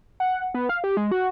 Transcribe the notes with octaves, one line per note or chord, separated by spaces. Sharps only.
F#5
B3
F5
G4
G#3
F#4